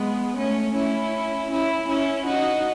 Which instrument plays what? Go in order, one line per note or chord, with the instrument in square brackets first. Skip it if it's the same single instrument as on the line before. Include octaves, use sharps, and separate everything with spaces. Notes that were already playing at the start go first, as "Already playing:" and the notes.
Already playing: [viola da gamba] G#3 B3
A3 C#4
C#4 E4
C#4 E4
C#4 E4
D#4 F#4